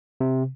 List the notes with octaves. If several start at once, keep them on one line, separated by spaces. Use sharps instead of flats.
C3